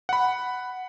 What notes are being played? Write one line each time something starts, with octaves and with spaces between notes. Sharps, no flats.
F#5 B5